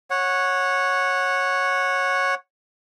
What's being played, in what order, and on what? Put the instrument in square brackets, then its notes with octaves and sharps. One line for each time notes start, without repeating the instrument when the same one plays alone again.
[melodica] C#5 F#5